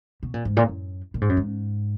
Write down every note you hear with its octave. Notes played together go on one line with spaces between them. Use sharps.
B2
A#2
G#2
A#2
F#2
A#2
G#2
F#2
G#2